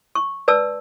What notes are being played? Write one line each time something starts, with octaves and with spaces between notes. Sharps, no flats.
C#6
B4 D5 A5 E6